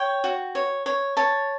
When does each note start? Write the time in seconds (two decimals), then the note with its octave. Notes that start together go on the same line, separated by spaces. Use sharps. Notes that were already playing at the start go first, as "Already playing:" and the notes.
Already playing: C#5 G5
0.24 F#4
0.55 C#5
0.86 C#5
1.17 C#5 A5